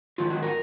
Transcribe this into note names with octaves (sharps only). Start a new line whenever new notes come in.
G#2 D#3 F#3 F4
F#4
A#4